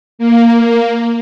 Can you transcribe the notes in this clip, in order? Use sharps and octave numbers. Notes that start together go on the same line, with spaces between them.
A#3